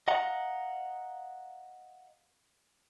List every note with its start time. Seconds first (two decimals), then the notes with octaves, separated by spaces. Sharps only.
0.08 D#5 F5 F#5 A#5